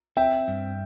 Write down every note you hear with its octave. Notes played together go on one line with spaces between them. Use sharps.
C4 E5 G5
G2